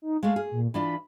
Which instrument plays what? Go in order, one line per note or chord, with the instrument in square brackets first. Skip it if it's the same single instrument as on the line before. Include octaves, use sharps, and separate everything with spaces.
[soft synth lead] D#4
[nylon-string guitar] G#3 A3 [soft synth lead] F5
[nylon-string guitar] G#4
[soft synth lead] A#2
[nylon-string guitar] E3 D4 F4 [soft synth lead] B5